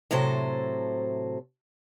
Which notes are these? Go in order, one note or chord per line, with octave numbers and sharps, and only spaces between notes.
A2 C3 F#3 A4 C5